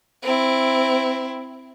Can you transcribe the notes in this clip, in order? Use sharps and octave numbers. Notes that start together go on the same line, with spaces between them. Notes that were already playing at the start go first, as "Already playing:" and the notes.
C4 E4